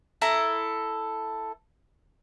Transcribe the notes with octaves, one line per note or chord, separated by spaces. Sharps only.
E4 A4 A#5